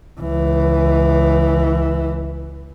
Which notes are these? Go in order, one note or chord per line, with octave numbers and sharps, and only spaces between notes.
C#2 E3